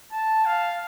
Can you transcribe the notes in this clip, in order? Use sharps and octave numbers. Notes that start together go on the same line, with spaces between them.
A5
F5